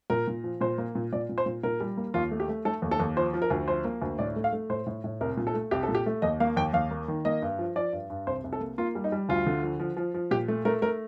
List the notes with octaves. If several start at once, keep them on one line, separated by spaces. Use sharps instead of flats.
A#2 A#4
A#2
F3
A#2 C5
A#3
A#2
A#2 D5
A#2
C5
A#2
A#2 A#4
G3
A#3
D#2 F4
A3
G4
A3
A3 A4
D#2
A4
D#2
F3 C5
F3
A#4
D2
F3 C5
A#3
D2
A2 D5
A3
F5
A3
A2 C5
A2
A2
C2 A#4
A#2
A4
A3
C2 G4
A4
A#2
G4
A3
D#2 D#5
A#3 F5
D#2 G5
D#2 F5
A#3
D#3
A#3 D#5
G2
F3
F3 D5
G2
G2
C2 C5
C2
A4
A#3
A#3 F4
G3
D#4
G3
D2 F4
D3
F3
F3
F3
F3
A#2 G4
A3
A3 A#4
A3 A#4